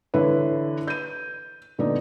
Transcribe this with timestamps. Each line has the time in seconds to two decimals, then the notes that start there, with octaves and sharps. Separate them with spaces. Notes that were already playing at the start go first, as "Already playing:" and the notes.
0.14 D3 E3 E4 B4 C#5
0.88 G6 D#7
1.78 A#2 D3 B3 D#4 D5